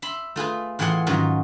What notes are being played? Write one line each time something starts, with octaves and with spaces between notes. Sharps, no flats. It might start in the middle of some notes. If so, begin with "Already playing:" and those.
E5 B5 C6
A3 F4 G#4 B4
A2 E3 F4 G#4 F#5 C6
G#2 D#3 F#3 C#4 F4